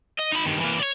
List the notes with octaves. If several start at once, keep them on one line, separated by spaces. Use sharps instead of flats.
D#5
D#4 B5
G2 D#3
E3 A#3
C#5 D5